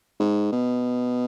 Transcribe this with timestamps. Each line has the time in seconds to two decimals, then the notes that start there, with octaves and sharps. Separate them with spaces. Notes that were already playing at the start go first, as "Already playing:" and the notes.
0.20 G#2
0.52 B2